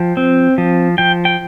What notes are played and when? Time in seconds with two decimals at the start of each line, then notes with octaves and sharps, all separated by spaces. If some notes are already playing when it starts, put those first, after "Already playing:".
Already playing: F3 G5
0.17 C4
0.58 F3
0.98 F3 G5
1.25 G5